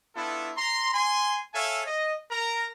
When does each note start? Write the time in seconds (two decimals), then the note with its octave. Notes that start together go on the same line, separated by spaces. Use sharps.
0.16 B3 D4 E4 F4 A4
0.57 A#5 C6
0.94 G#5 C6
1.54 A4 C#5 E5 F5 G#5
1.86 D#5
2.31 A#4 A#5